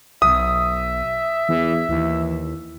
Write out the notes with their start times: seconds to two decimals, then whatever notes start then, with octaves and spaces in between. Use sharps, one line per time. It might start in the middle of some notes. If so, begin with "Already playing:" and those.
0.22 B1 E5 D#6
1.49 E2 E3
1.89 D#2 E3